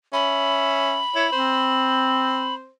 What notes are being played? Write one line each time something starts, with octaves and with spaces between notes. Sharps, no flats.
C#4 E5 B5
E4 C#5
C4 C5